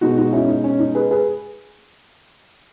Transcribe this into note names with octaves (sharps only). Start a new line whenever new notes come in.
B2 G#3 D#4 F#4
D#4 F#4
C#4 E4
D#4
C#4
D#4
G#4 B4
G#4 B4